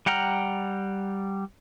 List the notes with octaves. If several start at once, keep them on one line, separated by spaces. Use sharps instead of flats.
G3 F#5 G5 A#5 F6